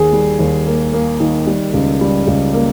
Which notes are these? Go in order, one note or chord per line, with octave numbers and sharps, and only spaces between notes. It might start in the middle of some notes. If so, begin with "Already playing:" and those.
Already playing: D#2 G#4
G3
D#2
A#3
A#3
D#3
G3
C#2
G3
C#2
A#3